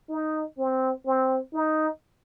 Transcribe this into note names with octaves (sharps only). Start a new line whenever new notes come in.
D#4
C4
C4
D#4